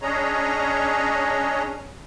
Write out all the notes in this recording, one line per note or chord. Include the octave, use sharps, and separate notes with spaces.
C#4 D4 G#4 C#5 D#5 A#5